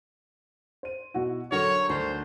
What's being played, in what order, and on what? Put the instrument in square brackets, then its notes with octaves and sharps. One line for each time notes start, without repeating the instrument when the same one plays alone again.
[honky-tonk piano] C5 D#7
B2 E4 F#4
[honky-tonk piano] D3 F#3 [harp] A#4 [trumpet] C#5
[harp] D2 [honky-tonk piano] D3 [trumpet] C5